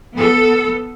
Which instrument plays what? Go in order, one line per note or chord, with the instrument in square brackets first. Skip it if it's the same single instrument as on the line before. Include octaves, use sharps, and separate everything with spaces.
[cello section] B3 A4